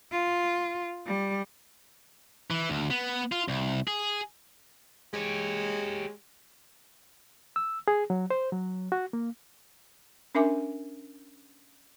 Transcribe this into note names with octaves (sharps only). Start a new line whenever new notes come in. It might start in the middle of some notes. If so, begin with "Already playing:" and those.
F4
G3
E3
D2
B3
F4
C2
G#4
G#3 G4 C#5
E6
G#4
F#3
C5
F#3
F#4
A#3
C#4 D4 A#4 E5 G#5 D6